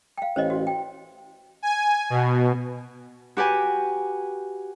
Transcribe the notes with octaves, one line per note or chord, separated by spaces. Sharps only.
F5 G5
A1 C5 C#5 D#5
F#4
G5
G#5
B2
F#4 G4 B4 G#5